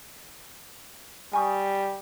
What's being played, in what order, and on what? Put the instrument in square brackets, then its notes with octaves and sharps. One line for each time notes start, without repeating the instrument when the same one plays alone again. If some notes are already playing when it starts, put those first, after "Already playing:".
[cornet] G3 [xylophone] G#5 C#6 D#6